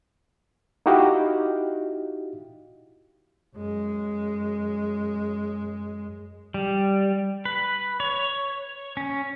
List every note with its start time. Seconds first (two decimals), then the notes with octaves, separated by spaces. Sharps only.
0.86 D#4 E4 F#4 G4 D#5 F5
3.55 F#2 G#3
6.54 G3
7.45 B4
8.00 C#5
8.97 C#4